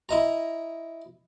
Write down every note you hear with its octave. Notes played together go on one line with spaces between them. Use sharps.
E4 D#5 A#5